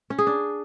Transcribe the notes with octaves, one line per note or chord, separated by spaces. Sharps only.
C#4
G#4
D4